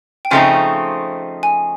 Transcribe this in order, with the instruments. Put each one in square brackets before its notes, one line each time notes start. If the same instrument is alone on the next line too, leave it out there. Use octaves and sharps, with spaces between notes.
[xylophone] G5
[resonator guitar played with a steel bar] C#3 F3 A3 C4 D#4 [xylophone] G#5
[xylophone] G#5